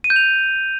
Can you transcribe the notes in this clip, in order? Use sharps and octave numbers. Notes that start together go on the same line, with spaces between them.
D#7
G6
F7